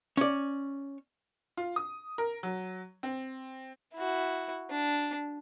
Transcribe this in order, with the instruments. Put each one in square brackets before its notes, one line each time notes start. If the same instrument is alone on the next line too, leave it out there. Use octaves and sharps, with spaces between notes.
[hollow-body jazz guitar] C#4 D5
[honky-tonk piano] F4
D#6
A#4
F#3
C4
[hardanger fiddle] E4 F#4
D4